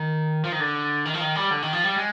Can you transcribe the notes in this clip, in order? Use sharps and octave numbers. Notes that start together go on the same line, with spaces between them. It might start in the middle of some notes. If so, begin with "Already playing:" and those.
Already playing: D#3
F3
D#3
D3
D#3
F3
D#3
G3
D3
D#3
F3
G3
G#3